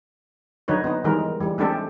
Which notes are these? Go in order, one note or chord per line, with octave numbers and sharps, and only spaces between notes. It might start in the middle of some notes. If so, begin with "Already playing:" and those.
D3 F#3 D#4 B4 C#5
B3 D#4
D#3 E3 G3 G#3 A#4
E3 G3
G#3 A3 C4 D4 G4 A4